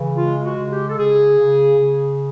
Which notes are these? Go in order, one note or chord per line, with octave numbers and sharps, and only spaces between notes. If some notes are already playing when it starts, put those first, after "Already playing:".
Already playing: C#3 E3
G#3 F4
F#4
C#3
G4
A4
C#3 G#4
C#3
C#3